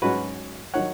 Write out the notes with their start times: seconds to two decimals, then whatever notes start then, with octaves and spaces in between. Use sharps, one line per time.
0.02 G#2 F#3 C#4 F#4 B4
0.74 D#3 F#3 C#5 F#5